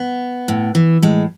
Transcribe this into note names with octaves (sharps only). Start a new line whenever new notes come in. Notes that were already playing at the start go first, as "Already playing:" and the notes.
Already playing: B3
A2
E3
A2 G#3